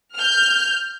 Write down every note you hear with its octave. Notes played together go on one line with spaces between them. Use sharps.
F6 G6